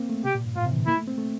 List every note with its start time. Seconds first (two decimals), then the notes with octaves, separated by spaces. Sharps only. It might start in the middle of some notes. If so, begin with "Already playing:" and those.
Already playing: A#3 C4
0.09 A3
0.24 C3 G4
0.35 A#2
0.45 G2
0.56 A2 F4
0.66 C3
0.72 E3
0.76 D3
0.87 A#3 E4
0.98 A3
1.08 C4
1.18 A3